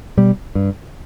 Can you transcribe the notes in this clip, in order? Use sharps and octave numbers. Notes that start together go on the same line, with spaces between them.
B2 G3
G2